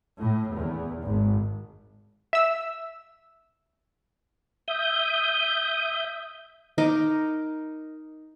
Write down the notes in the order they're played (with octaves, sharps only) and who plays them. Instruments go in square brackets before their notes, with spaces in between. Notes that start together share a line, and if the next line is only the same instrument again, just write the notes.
[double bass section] A2
E2
G#1
[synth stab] E5 E6
[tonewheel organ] E5 D#6 G6
[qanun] D#4 A#4 D#5 D6